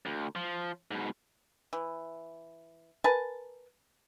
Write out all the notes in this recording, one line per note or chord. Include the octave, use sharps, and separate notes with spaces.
D2
F3
G#2 B2
E3
A#4 B4 G#5 A5